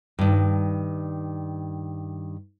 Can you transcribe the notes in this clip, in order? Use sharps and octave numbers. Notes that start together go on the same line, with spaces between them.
G2 D#3